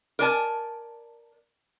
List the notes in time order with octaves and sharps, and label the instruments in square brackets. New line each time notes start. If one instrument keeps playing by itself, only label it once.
[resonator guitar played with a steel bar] A#4 D5 G#5 A5